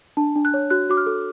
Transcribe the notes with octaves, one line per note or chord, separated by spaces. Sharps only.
D4 A5
D4
F#6
C#5
F#4 F#6
F#4 D6
F6
A4